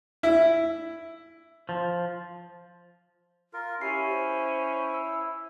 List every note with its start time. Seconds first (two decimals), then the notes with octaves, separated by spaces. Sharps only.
0.23 E4
1.69 F3
3.53 F4 A#4
3.81 C#4 E4 G4 C7
4.09 C5
4.94 E6